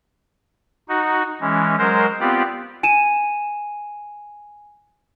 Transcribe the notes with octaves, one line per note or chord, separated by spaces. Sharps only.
D#4 F#4
E3 G#3 C#4
F#3 G#3 A#4 C5
B3 C4 F4 G4 D5
G#5 D#7 E7